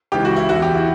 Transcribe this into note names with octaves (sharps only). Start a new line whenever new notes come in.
C#2 C#3 E3 G4
F#4
E4
E2 D3 F#4
G4
E4